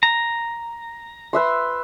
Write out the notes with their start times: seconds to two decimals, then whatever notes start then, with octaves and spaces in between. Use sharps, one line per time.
0.03 A#5
1.33 B4 E5 C6